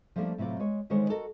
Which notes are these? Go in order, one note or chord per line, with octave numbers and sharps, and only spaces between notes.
F3 G3 A3 A#3 D4
A2 C3 F#3 F4 D5
G#3 C#5
D3 D#3 G3 G#3 C5 C#5
F#4 A4 A#4 D#5